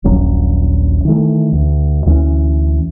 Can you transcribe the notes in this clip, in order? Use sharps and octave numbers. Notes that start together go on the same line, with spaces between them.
D#1 A#1 F#3 C#4
D#3 E3 A3
D2
D2 E3 G3 C#4